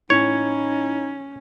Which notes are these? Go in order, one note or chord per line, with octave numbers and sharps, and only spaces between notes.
A2 C#4 D#4 C#5